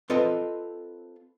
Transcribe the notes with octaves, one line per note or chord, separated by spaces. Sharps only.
C4 F4 A4 B4 D#5